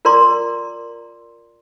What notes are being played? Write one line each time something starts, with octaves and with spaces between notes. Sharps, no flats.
F4 A#4 D5 A#5 C6 D6